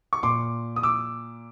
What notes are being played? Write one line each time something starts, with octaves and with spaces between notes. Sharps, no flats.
C#6
A#2 C6 D6
D#6
D6 E6